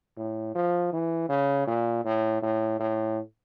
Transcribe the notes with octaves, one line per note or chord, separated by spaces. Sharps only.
A2
F3
E3
C#3
A#2
A2
A2
A2